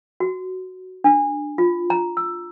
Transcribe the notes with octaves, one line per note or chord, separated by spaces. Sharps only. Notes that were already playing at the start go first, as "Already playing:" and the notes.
F#4
D4
F4
A#5
E6